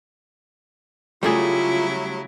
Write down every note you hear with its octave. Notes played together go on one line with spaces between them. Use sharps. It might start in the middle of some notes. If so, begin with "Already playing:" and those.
C#3 F#3 G3 A3 E4 F4 G#4